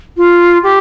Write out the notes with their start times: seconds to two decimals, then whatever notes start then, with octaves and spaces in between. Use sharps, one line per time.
0.17 F4
0.63 G4